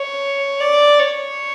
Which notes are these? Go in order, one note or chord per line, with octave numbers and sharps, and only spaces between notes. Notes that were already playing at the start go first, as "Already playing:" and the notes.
Already playing: C#5
D5
C#5